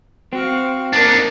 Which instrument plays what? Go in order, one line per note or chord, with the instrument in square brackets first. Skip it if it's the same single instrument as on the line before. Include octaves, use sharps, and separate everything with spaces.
[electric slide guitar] C4 [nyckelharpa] F#4 F5
[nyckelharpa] A#3 [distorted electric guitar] D4 D#4 [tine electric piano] A6